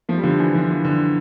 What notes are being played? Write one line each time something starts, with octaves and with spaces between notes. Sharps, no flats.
F3 A3
G3
D3 F3
E3
D3 F3
E3
D3